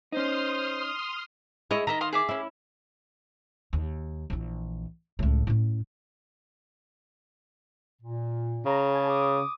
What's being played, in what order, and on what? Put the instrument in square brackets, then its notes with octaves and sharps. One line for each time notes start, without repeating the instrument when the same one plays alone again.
[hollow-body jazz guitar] C#4 D#4 [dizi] C5 [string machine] C6 D#6 F6
[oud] G#3 E4 [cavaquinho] C#5 D#5
[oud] D#3 [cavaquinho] D#5 E5 A#5
[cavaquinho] F5 C6 D#6
G#4 E5 D6
[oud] C#4 E4
[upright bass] D#2
A#1 E3
C#2 A2
A2 C#4
[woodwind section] A#2
[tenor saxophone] C#3 [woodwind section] A#5
[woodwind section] G#4 G#5 A5
D6 D#6